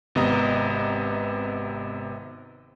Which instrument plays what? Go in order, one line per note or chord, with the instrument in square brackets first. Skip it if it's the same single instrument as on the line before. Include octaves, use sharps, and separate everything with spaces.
[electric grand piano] G#1 C3 B3 D#5 A#5 D#6